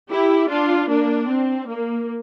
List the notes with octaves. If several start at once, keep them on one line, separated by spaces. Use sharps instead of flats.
E4 G4
D4 F4
A#3 D4
C4
A#3